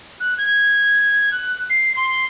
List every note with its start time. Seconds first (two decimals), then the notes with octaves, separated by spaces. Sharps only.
0.20 F#6
0.38 G#6
1.32 F#6
1.70 C7
1.96 C6